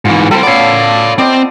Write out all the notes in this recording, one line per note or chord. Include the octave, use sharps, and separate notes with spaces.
G#2 E3 F4
G3 A4 C5 C6
B3 C#4 D5 F5
C4 D5 D#5